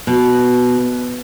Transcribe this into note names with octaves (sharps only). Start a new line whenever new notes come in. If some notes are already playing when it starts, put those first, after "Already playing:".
B2